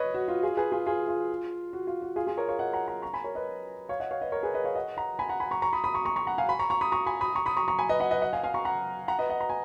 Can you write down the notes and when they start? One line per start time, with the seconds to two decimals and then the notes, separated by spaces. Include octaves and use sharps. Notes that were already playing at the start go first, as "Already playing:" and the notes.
Already playing: B4 C#5 D#5
0.14 F#4
0.28 F4
0.43 F4 G#4
0.57 G#4 B4
0.72 F4 G#4
0.86 F4 G#4
1.08 F4
1.73 F#4
1.87 F4
2.02 F#4
2.16 F4 G#4
2.27 F4 G#4
2.37 A#4 C#5
2.49 C#5 F5
2.59 D#5 F#5
2.73 F#5 A#5
2.88 F#5 A#5
3.02 A#5 C#6
3.13 G#5 B5
3.24 A#4 C#5
3.35 B4 D#5
3.89 C#5 F5
4.00 D#5 F#5
4.11 C#5 F5
4.21 B4 D#5
4.32 A#4 C#5
4.43 G#4 B4
4.54 B4 D#5
4.64 C#5 F5
4.75 D#5 F#5
4.97 F#5 A#5
5.19 G#5 B5
5.29 F#5 A#5
5.40 G#5 B5
5.51 A#5 C#6
5.62 A#5 C#6
5.73 B5 D#6
5.84 B5 D#6
5.94 A#5 C#6
6.05 A#5 C#6
6.16 A#5 C#6
6.27 F#5 A#5
6.38 F5 G#5
6.49 G#5 B5
6.59 A#5 C#6
6.70 A#5 C#6
6.81 B5 D#6
6.92 A#5 C#6
7.06 G#5 B5
7.21 B5 D#6
7.35 A#5 C#6
7.46 B5 D#6
7.57 A#5 C#6
7.68 A#5 C#6
7.79 G#5 B5
7.89 B4 D#5
8.00 D#5 F#5
8.11 B4 D#5
8.22 D#5 F#5
8.33 F5 G#5
8.43 F5 G#5
8.54 A#5 C#6
8.65 F#5 A#5
9.08 F#5 A#5
9.19 B4 D#5
9.30 D#5 F#5
9.41 A#5
9.49 G#5